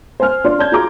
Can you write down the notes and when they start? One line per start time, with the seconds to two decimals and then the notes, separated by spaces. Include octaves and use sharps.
0.20 C5 G#5 F6
0.44 D4 F4 D5 C6
0.59 D5 A5 G6 G#6
0.72 F4 F#4 G#4 A#5 C6 D6